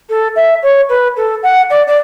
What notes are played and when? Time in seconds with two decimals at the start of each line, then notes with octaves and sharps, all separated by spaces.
0.09 A4
0.35 E5
0.62 C#5
0.89 B4
1.16 A4
1.43 F#5
1.70 D5
1.87 D5